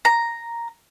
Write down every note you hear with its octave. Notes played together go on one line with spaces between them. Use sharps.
A#5